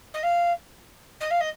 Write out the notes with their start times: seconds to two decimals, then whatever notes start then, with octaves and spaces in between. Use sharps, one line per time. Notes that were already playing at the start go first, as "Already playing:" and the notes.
0.14 D#5
0.23 F5
1.21 D#5
1.31 F5
1.41 D#5